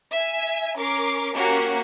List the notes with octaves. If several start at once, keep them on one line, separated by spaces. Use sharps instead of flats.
E5 G#5
C#4 A#4 D6 C7
A#3 C#4 F#4 G4 F#5